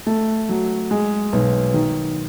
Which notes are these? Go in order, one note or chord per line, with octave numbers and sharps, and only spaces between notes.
A3
F#3
G#3
B1
D#3